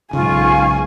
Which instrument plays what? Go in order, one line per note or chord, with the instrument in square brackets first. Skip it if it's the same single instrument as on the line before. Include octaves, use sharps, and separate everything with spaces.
[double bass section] B1 G#2 [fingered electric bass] C#3 [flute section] F4 [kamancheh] G#5 C#6